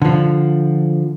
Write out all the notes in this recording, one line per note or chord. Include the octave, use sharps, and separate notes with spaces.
D3 F3